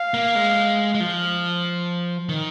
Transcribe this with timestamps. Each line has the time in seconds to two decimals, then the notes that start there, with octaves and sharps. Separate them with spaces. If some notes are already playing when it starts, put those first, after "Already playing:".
Already playing: F5
0.14 A#3
0.35 G#3
0.95 G#3
1.00 F3
2.29 D#3